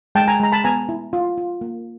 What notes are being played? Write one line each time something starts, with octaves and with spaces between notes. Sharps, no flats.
G#3 G5 A5
G#5 A#5
G#3 A#5
A5 B5
B3 G#5 A#5
E4
F4
F4
A#3